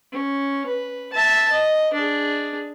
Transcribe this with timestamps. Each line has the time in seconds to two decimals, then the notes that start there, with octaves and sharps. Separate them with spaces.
0.12 C#4
0.66 B4
1.13 E5 A5
1.52 D#5
1.94 D4 G#4